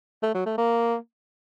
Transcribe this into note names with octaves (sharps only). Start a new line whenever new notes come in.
A3
F#3
A3
A#3